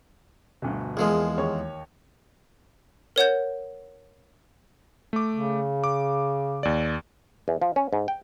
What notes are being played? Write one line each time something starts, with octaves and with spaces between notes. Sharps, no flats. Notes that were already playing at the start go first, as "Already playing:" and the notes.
G1 D2 B2
E2 F3 G#3 A#3 G#4
D#2 C#5
A#4 C#5 F#5 G6
A3 D6
C#3
D6
D#2 D5
E2
F3
C#4
G#2
G5